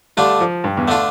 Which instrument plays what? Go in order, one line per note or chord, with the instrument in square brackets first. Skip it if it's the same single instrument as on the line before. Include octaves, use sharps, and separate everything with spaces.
[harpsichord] D3 A3 D4 F4 [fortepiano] G3
[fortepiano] F3
G2
E2
[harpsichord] D3 A3 D4 F4